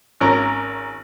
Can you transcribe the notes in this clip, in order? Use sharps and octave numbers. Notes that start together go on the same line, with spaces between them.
G#1 C#4 A#4 A#5